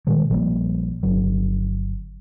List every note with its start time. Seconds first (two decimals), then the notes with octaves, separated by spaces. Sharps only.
0.07 A#2 D#3 G3 G#3
0.30 A#1 F3 G3 A#3
1.03 G1 F#3